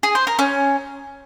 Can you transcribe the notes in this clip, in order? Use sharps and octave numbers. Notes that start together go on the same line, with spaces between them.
G#4
C5
A#4
C#4